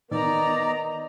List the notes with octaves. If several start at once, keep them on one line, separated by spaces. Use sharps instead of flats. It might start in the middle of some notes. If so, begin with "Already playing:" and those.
D#3 B3 D5 D#5 A#5